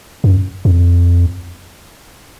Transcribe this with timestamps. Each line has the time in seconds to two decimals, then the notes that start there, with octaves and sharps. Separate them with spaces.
0.24 F#2
0.65 F2